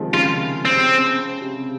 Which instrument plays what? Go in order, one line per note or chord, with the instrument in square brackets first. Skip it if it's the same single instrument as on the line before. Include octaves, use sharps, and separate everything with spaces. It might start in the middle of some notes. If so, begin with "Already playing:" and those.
Already playing: [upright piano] C3 D#3 F3 G#3
[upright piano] C#3 F3 [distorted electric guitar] F4
[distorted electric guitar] C4
[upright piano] C3